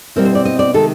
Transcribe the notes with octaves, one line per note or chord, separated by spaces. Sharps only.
B2 G3 C4 E4 A#4
C5
D5
D#5
D5
C3 D#3 G#3 A4